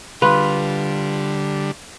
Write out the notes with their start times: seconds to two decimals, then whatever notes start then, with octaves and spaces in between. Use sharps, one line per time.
0.22 D3 G3 F4 B4